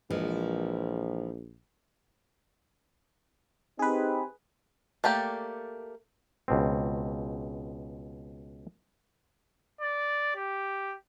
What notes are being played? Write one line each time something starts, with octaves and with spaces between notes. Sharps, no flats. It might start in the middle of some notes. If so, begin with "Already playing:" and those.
A#1 E3 F3 G#3
C4 D#4 G4 G#4 B4
A3 A#3 G4 D5
C#2 B2 C4
D5
G4